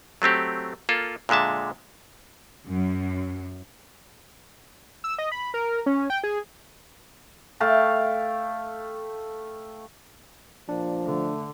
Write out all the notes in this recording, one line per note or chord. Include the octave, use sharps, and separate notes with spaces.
F#3 A3 C4 G4
A#3 F4 A4
A#2 D3 G#3 E5 A5
F#2
E6
D#5
B5
A#4
C#4
G5
G#4
A3 F5 G5 A5
A#2 F3 D4
D3 A3